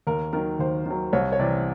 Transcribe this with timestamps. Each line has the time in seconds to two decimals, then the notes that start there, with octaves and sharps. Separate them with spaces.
0.07 D#2 A#4
0.33 D#3 F#3 A#4
0.59 D#2 C5
0.86 D#3 F#3
1.13 C2 C#5
1.33 C#5
1.39 C3 E3 D5